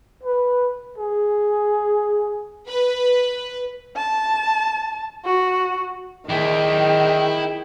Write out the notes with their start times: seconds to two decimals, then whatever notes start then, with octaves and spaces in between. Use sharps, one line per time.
0.23 B4
0.98 G#4
2.68 B4
3.96 A5
5.25 F#4
6.29 D#3 E4 G#4 D5 G5